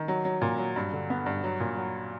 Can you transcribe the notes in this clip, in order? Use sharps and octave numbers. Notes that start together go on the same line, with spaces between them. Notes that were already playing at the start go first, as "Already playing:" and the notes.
Already playing: D#3
F#3
F#3
A#2
F#3
G2
D3
B3
G2
F#3
A#2
F#3